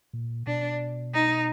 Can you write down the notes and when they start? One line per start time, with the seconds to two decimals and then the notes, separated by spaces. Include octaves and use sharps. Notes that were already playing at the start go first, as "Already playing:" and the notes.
0.13 A#2
0.46 B2 D4
1.13 D#4